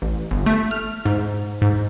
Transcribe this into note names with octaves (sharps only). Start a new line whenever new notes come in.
A1
G1
A3
F6
G#2
G#2